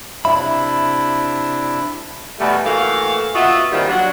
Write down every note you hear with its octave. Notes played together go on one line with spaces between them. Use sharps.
C3 D4 E4 E5 B5
E2 B2 G3 A3
E3 A3 A#3 F#4 A4 F5
B3 F4 F#4 D#5 E5
A#2 D#3 G3 C4 F4
F#3 D4 F#4